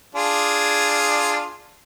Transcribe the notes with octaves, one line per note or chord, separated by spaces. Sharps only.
D4 F4 G#4